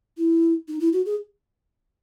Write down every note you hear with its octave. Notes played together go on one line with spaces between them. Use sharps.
E4
D#4
E4
F#4
G#4